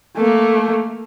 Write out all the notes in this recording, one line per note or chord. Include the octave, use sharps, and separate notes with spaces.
A3 A#3